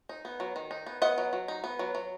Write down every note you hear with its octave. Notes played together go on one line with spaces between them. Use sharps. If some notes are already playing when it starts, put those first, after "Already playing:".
D#4
B3
F#3
D#3
D#4
B3
B3 D#5 F#5
F#3
F#3
D#4
B3
F#3
F#3